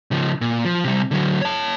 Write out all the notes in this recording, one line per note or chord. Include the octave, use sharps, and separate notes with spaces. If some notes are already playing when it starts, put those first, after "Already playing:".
C#3 F3
A#2
F3
C3 G3
D3 F#3
C#5 A5